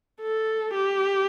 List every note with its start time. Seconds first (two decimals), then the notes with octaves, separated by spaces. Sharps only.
0.21 A4
0.74 G4